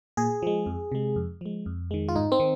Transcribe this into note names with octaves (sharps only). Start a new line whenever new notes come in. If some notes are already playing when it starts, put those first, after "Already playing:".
A#2 G#4
F3 G#3
F2
C3 G#3
F2
F3 G#3
F2
D#3 G#3
F4
G#2 D#4
C4
D#3